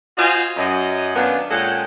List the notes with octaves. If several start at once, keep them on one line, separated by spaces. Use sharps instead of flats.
F4 F#4 C5 D#5 G#5
F#2 D#5
F#2 D#3 A#3 B3 D4
A#2 G#3 C#4 A4 F#5 G5